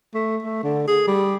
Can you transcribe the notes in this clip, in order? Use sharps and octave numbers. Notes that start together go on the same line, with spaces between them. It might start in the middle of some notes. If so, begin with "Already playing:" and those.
A3
A3
D3
G#4
G3